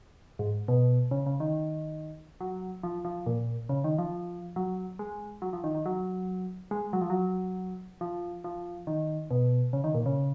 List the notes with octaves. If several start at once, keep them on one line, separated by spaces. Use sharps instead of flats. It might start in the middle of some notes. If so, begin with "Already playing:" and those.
G#2
B2
C#3
C#3
D#3
F#3
F3
F3
A#2
C#3
D#3
F3
F#3
G#3
F#3
F3
D#3
D#3
F#3
G#3
F#3
F3
F#3
F3
F3
D#3
B2
C#3
D#3
A#2
C#3